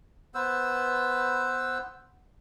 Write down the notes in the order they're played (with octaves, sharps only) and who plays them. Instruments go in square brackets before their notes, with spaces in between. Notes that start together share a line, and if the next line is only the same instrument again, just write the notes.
[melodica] B3 B4 C5 E6